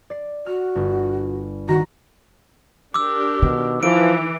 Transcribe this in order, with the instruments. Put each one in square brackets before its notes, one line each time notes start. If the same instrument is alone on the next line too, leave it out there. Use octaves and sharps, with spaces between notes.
[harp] D5 C7
[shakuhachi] F#4 [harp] F6
[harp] G1
[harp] D#3 A#5 [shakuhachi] F#4
[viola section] D4 G4 A#4 [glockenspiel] D6 E6
[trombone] B2 [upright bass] D#3
[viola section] E3 [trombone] F3 [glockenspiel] D7